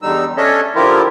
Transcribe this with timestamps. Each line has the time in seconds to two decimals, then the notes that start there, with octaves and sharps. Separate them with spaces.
0.02 E2 D3 G3 D#4 E6
0.37 C#4 D4 A4 C#5 D#5 E5
0.75 D3 F3 E4 F4 G4 A#4